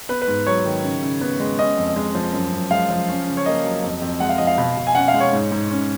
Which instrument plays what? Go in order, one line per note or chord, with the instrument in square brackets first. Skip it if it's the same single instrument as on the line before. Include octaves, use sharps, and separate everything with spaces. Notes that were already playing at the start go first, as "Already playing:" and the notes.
[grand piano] B3 B4
B4
G#2
F#3 C#5
D#3
C#3
C#3
B3
G#3
C#4 D#5
F2
G#3
F3
F#2
F#2
G#3 F5
F3
C#4
C#3
C#5
A#3 D#5
F#3
F2
F2
G#3 F#5
F5
F3 D#5
F5
B2
B2
G#5
C#4 F#5
F5
G#3
C#5
G#2
G#2
C#4